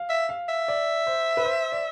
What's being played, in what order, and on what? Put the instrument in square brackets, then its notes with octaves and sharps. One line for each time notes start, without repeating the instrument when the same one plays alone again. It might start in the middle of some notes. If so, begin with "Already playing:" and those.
Already playing: [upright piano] F5
[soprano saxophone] E5
[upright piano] F5
[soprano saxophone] E5
[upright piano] D5
C5
B4
C5
D5